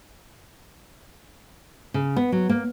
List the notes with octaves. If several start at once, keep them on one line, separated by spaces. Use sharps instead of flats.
C#3
B3
F#3
A#3